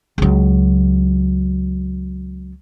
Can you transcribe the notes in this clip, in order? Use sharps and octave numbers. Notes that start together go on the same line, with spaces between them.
C#2 F#3